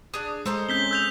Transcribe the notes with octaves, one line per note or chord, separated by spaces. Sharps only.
D4 G#4 D#6
G#3 A4 C5 A#5
C4 C#4 G6 B6 G7
E6 G6 F7